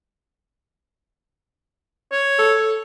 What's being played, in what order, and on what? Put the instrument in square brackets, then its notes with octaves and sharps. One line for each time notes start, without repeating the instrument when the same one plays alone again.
[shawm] C#5
[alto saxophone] A4